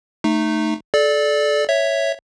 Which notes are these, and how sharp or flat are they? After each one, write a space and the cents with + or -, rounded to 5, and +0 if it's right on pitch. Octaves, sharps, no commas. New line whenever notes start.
A3 +0 D#4 -15
A4 -30 D5 +0
C#5 +0 E5 +0